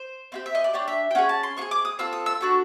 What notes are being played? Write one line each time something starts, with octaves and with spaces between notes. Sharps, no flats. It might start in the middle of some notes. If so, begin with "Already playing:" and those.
Already playing: C5
C4 E4 G4
E5
D#5
D5
D4 G4 C#5
E5
G5
C#4 F4 G#4 F#5
A5
C6
C4 F4 G#4 C#6
D6
D#6
C4 F4 A4 E6
D#6
E6
D4 F#4 A4